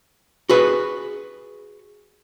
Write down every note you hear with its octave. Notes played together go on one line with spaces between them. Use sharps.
F#4 G#4 B4